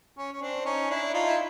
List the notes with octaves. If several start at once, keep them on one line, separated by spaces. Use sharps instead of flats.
C#4
C#4
C4 D4
C#4 D#4
D4 E4
D#4 F4
E4